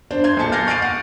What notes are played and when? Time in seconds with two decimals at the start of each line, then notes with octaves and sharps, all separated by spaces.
0.11 D4 C5
0.24 C6 G6 G#6
0.37 B1 A#2 G#5 A5 C#7
0.52 F6 G6 A6 A#6 C7
0.67 C#6 F6 A6 C7 D7 D#7
0.82 F#5